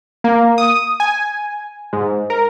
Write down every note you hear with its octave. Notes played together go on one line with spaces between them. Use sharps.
A#3
D#6
G#5
G#2
A#4